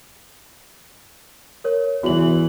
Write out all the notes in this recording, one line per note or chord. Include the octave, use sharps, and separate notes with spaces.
A#4 C#5
E2 E3 F#4 F#7